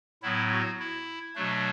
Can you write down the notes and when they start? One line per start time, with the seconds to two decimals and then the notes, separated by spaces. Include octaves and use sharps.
0.23 A2 F#3 B3 E4
0.51 F#4
0.80 E4
1.35 B2 F#3 A3 D4